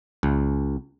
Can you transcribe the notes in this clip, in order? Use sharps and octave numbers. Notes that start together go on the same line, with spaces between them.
C#2